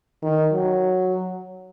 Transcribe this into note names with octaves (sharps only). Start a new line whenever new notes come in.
D#3
F#3